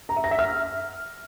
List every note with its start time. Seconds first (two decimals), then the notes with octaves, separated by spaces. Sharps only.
0.09 A#5
0.16 E5
0.24 A#6
0.31 E5
0.39 F6